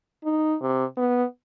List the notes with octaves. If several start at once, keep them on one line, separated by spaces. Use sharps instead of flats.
D#4
C3
B3